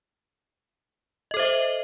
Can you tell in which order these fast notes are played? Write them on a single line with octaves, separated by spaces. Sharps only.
D#5 A4 C5 E5